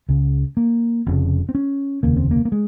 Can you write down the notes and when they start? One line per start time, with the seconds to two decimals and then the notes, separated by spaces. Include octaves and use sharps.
0.09 C#2 C#3
0.57 A#3
1.06 F1 F2 C#3
1.49 C4
1.55 C#4
2.03 F1 D#2 C#3 A#3
2.16 C4
2.31 A#3
2.45 A#3
2.52 G#3